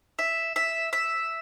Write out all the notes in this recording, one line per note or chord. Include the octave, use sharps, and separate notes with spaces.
E5
E5
E5